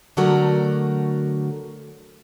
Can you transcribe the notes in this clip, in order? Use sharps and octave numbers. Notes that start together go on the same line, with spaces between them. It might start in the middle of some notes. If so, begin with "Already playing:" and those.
D3 F#3 A3 F#4 A#4